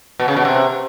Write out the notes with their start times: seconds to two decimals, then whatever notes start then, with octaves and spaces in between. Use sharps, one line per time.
0.20 B2
0.28 C#3
0.36 B2
0.45 C3